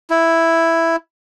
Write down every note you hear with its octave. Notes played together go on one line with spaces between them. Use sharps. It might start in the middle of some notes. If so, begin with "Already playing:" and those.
E4